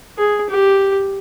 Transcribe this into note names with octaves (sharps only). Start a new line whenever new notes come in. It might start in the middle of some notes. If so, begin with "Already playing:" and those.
G#4
G4